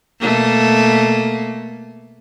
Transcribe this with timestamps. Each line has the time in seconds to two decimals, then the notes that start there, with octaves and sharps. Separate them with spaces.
0.20 B2 A3 A#3